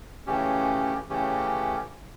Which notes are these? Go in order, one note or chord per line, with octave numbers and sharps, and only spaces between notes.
C#3 E3 A3 C#4 G4
C#3 E3 A3 C#4 G4